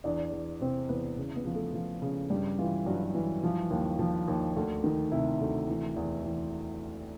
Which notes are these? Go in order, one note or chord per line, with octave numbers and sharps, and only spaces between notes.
E2 D4 D5
E2
C3 C4 C5
E2 B3 B4
C#3
B3 B4
F3
A3 A4
F3
C#3
G2 G3 G4
E3 F4
G2 F#3 F#4
E3
F3
D#2
F3
D#2
D2
D#3
C3 E4
D2
E3
E2
E2 E4